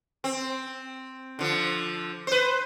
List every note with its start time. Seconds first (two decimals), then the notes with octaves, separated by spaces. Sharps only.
0.24 C4
1.39 D3 F3
2.27 B4 C5